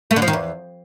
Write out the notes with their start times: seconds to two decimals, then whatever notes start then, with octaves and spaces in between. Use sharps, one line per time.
0.11 A3
0.16 D3
0.22 F3
0.28 D#3
0.33 E2